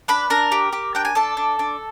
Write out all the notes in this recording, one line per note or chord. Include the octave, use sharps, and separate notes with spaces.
D4 B4 B5
D4 A#4 A#5
G4
G4
D4 G5
G#5
D4 A4 A5
D4
D4